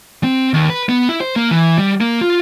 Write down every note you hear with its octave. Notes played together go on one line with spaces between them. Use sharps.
C4
D#2
B4
B3
E4
C5
A#3
E3
G3
A#3
F4